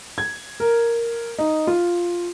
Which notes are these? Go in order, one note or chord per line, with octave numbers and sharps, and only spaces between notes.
G#6
A#4
D#4
F4